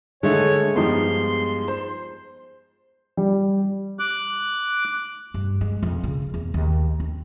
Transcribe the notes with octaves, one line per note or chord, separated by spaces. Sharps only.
D3 G#3 A3 C#5
G2 F3 B3 D#4 G4 C6
C5
G3
D6 F#6
G2
G#3
F2
C#3
E2
D#2
C4